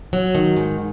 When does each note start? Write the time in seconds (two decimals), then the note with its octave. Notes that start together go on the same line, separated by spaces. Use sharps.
0.13 F#3
0.35 D#3
0.56 G#2